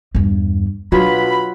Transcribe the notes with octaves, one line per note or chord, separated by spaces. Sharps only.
E2 G2
B2 F#3 D4 F4 B5